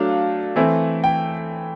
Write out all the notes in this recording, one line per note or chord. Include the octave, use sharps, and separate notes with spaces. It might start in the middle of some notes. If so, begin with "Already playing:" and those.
Already playing: F#3 A3 D4 F5
E3 A3 C4 E4
G5